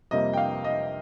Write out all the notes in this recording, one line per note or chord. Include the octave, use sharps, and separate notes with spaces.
F2 C3 G3 A#3 D#5
G5
F5
D#5